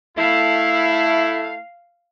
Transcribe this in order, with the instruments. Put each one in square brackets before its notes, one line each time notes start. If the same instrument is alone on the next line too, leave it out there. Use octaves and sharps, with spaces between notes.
[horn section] A3 E4 [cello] F5